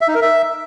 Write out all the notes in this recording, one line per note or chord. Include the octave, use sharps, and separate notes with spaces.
E5
D#4
A#4
E5